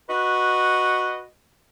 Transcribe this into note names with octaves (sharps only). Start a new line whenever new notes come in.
F#4 B4 D#5